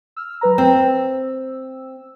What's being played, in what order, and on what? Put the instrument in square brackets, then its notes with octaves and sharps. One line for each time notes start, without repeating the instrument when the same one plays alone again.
[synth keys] E6 F6
F#3 B4 A#5
[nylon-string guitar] C4 [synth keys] E6